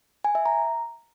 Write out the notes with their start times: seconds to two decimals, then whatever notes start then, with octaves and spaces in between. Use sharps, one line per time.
0.25 G#5
0.35 E5
0.46 A#5